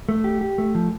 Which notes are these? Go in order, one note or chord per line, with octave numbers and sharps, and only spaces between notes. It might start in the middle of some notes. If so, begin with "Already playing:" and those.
A3
G4
G4
A3
F3